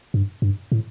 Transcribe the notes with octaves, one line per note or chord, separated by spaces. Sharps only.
G2
G2
A2